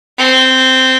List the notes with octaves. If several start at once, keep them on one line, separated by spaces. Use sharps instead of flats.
C4